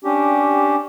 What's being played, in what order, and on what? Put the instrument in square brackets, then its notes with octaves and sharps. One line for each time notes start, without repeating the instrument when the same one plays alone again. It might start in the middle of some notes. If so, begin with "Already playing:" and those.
[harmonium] C#4 D4 G4